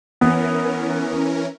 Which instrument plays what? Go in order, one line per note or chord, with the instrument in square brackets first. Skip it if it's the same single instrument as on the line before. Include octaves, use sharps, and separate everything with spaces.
[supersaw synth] E3 C#4 A#4 [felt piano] B3